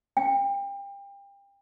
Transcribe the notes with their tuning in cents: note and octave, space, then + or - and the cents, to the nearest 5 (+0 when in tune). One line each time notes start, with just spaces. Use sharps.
G5 +30